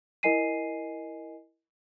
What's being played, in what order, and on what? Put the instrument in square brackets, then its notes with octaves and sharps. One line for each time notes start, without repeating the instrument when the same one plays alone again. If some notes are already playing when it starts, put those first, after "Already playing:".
[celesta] E4 A#4 D#5 G#5 C7 D#7